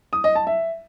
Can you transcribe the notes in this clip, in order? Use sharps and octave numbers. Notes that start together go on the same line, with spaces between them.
D#6
D#5
A5
E5